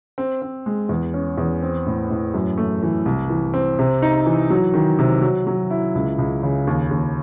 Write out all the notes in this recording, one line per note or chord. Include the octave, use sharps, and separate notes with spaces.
C4
C4
G#3
E2
C#4
E2
C4
A2
A2
F#2
A3
E3
C2
E3
C4
C3
D#4
E3
F#3
D#3
C3
F#3
F#3
E4
C#2
C#2
C#3
D#2
D#2